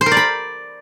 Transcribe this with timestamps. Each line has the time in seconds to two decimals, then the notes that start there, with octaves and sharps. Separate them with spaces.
0.01 C5
0.06 A#4
0.11 D5
0.17 B5